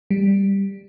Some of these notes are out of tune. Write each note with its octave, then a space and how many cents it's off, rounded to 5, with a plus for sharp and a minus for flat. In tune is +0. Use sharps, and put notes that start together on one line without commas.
G3 +5